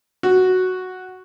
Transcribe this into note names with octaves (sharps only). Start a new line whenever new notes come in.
F#4